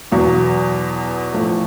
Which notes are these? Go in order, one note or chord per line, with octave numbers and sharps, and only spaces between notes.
E2 B2 F#3
A2 F3 A3